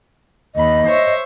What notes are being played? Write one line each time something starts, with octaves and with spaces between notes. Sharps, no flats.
D#2 D#5 B5
C5 C#5 E5